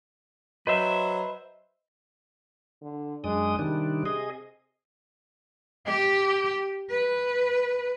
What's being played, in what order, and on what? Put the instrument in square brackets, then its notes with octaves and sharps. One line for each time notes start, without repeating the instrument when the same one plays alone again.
[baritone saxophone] F#3 [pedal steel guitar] B4 C5 E5 [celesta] D#5
[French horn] D3
[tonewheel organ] F#2 D4 D#6 [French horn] G#3
[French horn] C3 [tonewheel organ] D#3 G3 D4
[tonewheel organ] G#4 D#5
[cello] G4
B4